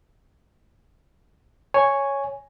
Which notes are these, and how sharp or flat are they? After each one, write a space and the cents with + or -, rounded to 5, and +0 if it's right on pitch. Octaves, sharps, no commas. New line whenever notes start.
C#5 +0 G#5 +0